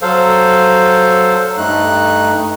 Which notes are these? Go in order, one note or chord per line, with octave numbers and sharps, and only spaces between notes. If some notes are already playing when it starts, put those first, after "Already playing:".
F#3 A4 C5 F5
G2 A3 D#4 F#6